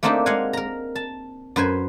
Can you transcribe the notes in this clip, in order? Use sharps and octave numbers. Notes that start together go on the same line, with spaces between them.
A3 A#3 C4 D4 D#4 G4
G#3 F5 F#5 G#5
A#4 A#5
A5
F#2 B4 C5 G#5